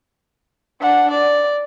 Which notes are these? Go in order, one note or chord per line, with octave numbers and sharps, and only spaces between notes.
D4 F#5
D5